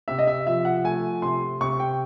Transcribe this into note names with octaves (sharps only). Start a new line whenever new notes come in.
C3 E5
D#5
E5
F3 E5
F#5
A3 G#5
C3 C6
C3 C#6
G5